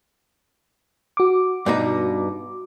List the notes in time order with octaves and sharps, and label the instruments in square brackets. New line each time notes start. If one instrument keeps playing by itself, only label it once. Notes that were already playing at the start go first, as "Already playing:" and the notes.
[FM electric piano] F#4 D6
[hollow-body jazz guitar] G2 B2 D#4